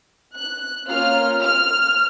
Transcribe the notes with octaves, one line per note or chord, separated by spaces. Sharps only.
F#6
A#3 C#4 F4 F6
F6